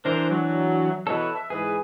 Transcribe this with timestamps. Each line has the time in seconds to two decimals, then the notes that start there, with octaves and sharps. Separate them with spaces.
0.05 E3 D4 A#4 C5
0.30 F#3
1.07 B2 E3 A4 B4 C#5
1.35 E5
1.50 G#2 E3 G#4 B4